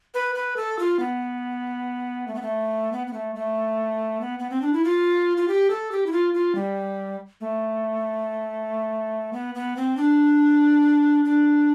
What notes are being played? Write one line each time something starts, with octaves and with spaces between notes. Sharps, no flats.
B4
B4
A4
F4
B3
A3
B3
A3
B3
B3
A3
A3
B3
B3
C4
D4
E4
F4
F4
G4
A4
G4
E4
F4
F4
G3
A3
B3
B3
C4
D4
D4